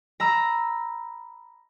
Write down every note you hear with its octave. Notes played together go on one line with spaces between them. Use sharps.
A#5 B5 E6